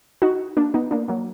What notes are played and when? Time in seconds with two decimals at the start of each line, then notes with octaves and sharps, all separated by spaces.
0.22 D#4 F#4
0.57 A#3 D4
0.74 B3 D#4
0.91 A#3 D4
1.08 F#3 A#3